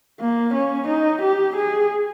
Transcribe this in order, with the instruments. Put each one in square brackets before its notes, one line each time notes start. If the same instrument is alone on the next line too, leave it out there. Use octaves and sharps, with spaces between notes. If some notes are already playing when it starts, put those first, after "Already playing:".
[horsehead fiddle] A#3
C#4
D#4
G4
G#4